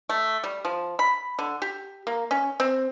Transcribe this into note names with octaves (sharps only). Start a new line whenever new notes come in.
A3
G3
F3
B5
D3
G4
A#3
C#4
C4